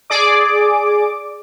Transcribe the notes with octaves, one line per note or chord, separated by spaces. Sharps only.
G#4 D5 D6